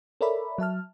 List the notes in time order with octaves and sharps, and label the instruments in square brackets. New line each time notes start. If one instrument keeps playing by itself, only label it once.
[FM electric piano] A4 A#4 C#5 D5 E5 B5
F#3 E5 A5 F6